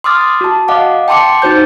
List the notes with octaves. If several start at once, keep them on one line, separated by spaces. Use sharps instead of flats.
C6 D6 D#6 F6 A6
F#4 A5
D#5 F5 F#5 D6
G5 A5 C6 D6 C#7
D#4 F#4 C5 G6